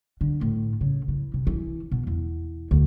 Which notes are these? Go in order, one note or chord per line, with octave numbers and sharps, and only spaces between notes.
D3
A2
C#3
E3
C3
E3
B2
E2
D2